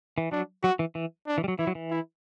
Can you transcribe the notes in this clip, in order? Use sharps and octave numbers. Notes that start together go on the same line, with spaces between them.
E3
F#3 D4
F#3 F#4
E3
E3
D4
E3
G3
F#3
E3 E4
F#3
E3
E4